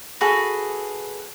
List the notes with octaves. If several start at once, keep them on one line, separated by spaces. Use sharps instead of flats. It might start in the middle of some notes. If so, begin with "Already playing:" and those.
F#4 G#4 A4 B4